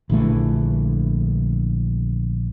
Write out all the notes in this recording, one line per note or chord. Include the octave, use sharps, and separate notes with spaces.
A#1 D3 E3 A3